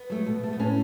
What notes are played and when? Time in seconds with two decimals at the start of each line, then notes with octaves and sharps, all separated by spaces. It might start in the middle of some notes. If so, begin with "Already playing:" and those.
Already playing: B3
0.10 F#3 A3
0.26 B2
0.43 A3
0.53 B3
0.59 A2 C#4